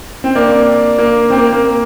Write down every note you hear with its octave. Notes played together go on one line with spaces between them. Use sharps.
C4
A#3 D4
A#3
C4
A#3
A#3